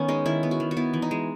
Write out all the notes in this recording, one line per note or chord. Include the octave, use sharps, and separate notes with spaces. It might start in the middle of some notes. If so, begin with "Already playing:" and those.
Already playing: D#3 B3 C#4
G#3 D#4
D#3 E4
B3
F#4
D#3
F#4
B3 E4
E3
D#4
G#3